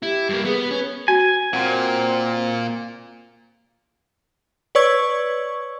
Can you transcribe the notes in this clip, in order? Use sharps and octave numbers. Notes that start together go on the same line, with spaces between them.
E4 G4
G2 A#3
B3 G#4
B4
C#4
F#4 G#5
A#2 C4 F#5 C6
B4 C#5 D5 C#6 E6 G#6